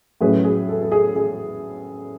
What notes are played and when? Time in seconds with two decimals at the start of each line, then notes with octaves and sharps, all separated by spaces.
0.21 A2 F#3 C#4 G#4 B4
0.44 G#4
0.69 A4
0.81 A4
0.92 G#4
1.16 G#4